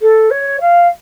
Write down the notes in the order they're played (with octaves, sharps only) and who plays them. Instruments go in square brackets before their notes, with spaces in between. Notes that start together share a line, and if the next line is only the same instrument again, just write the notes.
[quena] A4
C#5
F5